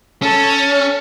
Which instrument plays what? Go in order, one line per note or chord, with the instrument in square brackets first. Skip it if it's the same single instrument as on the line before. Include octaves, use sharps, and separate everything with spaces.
[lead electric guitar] C#4 [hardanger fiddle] A4